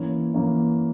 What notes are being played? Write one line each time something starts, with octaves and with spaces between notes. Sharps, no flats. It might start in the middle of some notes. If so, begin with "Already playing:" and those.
Already playing: E3 A#3 C#4
E3 A#3 C#4